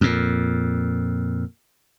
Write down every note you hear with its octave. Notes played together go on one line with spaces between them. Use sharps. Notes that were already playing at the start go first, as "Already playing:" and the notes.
F2 A#2